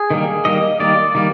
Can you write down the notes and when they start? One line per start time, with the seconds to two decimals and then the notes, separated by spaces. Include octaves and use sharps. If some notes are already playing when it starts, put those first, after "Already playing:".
Already playing: G#4
0.10 D#3 G3 A#3
0.45 D#3 G3 A#3 D#5
0.80 D#3 G3 A#3 D5
1.15 D#3 G3 A#3